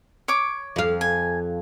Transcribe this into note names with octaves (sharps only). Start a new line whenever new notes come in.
C#5 D6
F2 F5
G#5